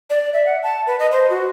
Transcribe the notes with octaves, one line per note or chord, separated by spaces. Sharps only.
D5
E5
F#5
A5
B4
D#5
C5
F#4